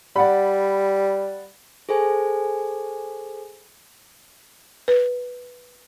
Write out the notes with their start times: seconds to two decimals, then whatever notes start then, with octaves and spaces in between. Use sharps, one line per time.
0.16 G3 D5 F#5 B5
1.89 G#4 A4 C5 G#5
4.88 B4